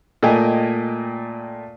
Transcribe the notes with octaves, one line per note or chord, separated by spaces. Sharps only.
A#2 A3 D#5 G5 G#5